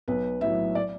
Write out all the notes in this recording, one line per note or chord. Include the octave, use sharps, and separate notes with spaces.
B1 B4
A2 F#3 E5
D5